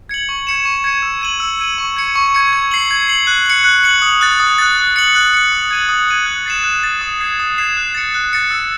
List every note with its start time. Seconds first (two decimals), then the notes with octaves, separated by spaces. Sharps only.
0.09 G#6 C#7 F#7
0.29 C#6
0.47 G#6 C#7 E7
0.65 C#6
0.84 G#6 C#7 E7
1.02 E6
1.22 G#6 D#7 F#7
1.40 E6
1.60 G#6 D#7 F#7
1.78 C#6
1.96 G#6 C#7
2.15 C#6
2.35 G#6 C#7
2.53 G#6
2.71 C7 F#7
2.91 G#6
3.08 C7 F#7
3.27 F#6
3.46 C#7 F#7
3.64 F#6
3.84 C#7 F#7
4.02 D#6
4.21 F#6 A6
4.40 D#6
4.58 F#6 A6
4.77 F#6
4.96 C#7 F#7
5.15 F#6
5.34 C#7 F#7
5.52 D#6
5.71 G#6 D#7 F#7
5.89 D#6
6.08 G#6 D#7 F#7
6.26 F#6
6.46 A6 C7 E7
6.64 F#6
6.83 A6 C7 E7
7.01 D#6
7.20 G#6 C7 E7
7.40 D#6
7.58 G#6 C7 E7
7.77 F#6
7.95 A6 C#7
8.14 F#6
8.33 A6 C#7
8.51 E6